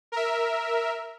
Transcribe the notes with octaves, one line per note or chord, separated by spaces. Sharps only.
A#4 E5